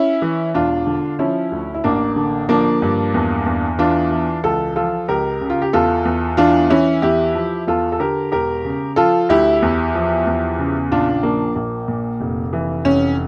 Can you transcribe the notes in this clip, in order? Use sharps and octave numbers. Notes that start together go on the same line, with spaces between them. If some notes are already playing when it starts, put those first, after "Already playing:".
Already playing: C#4 E4
E3
E1 D4 F4
D3
F3 C#4 E4
D2
E4
A1 A#3 D4
D3
F3 A#3 D4
G2
E2
E2
E3 D4 F4
E3
C#2 F4 A4
F3 F4 A4
C#2 G4 A#4
C#3
F4
G4
E2 F4 A4
E2
E3 D4 F4
E3 C#4 E4
E2 E4 G4
F3
E2 F4 A4
A4
D3 G4 A#4
E1 G4 A#4
C#3
F3 F4 A4
D2 E4 G4
E2
F3
E2
C#3
A#1 D4 F4
F3 A#3 D4
A#1 A#3
A#2
F1
E3
F1 C#4